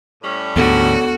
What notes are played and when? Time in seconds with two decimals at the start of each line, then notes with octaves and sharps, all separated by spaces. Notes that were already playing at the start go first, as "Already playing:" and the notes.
0.23 A2 G3 C#4
0.56 D2 G#2 B3 F#4 A4